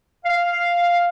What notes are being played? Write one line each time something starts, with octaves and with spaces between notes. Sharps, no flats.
F5